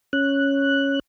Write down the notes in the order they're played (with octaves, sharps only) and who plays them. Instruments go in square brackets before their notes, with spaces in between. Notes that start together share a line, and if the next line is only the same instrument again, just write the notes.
[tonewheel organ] C#4 F#6